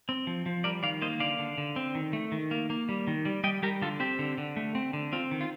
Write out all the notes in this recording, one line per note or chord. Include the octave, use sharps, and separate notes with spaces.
C4
F3
F3
G3 A#4 D5
D#3 D5 F5
A#3 C5 D#5
D3 D5 F5
D3
D3
C4
D#3
A3
D#3
A#3
A#3
G3
D#3
G3
G3 D#5 G5
G3 G4 A#4
D3 F4 A4
C4 G4
D3
D3
A3
C4
D3
C4 F4
D#3
F4